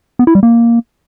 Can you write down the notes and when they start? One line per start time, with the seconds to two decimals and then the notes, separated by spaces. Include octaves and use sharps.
0.19 B3
0.27 E4
0.35 G3
0.43 A#3